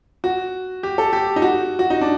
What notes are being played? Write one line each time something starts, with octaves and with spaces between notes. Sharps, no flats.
F#4
G4
A4
G4
D#4
F#4
F#4
D#4
D4